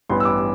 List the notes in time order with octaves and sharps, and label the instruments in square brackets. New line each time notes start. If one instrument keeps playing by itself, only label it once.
[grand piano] A1 G2 E3 B3 C6
E6
D6